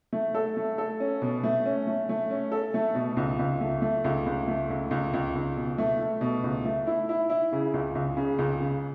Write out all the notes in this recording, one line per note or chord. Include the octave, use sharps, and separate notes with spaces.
A3
A4
A3
A4
C#4
B2
A3
C#4
A3
A3
C#4
A4
A3
B2
C#2
C#2
A3
A3
C#2
C#2
A3
C#2
C#2
C#2
C#2
B2
A3
A3
B2
C#2
A3
E4
E4
E4
C#3
C#2
C#2
C#3
C#2
C#3